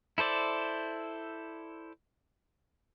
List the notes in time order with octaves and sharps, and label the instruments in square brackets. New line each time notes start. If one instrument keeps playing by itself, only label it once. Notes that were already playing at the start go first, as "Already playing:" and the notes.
[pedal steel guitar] E4 A4 C5 D5